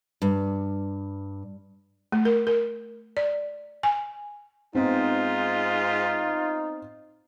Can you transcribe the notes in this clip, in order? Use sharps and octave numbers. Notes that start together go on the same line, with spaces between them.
G2
A3
A#4
A#4
D5
G#5
G#2 B3 C4 D#4 F4